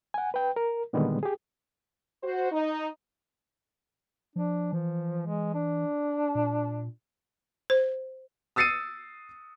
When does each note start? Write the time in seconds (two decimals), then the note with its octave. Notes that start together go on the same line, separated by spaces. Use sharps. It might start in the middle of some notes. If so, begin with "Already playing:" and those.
0.14 F#5 G#5
0.34 B4 G5
0.56 A#4
0.93 A#2 D3 D#3 G3 G#3 B3
1.23 G4 G#4
2.22 F#4 C5
2.52 D#4
4.36 F3 D4
4.73 E3 F3
5.26 G#3
5.54 D4
6.35 A#2
7.70 C5
8.56 D#6 E6 A6 C7 C#7 D#7